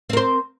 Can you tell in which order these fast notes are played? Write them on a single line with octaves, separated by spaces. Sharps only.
C4 A#4 C5